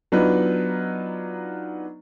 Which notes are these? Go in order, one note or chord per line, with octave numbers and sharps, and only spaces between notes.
F#3 B3 D4 D#4 F4 B4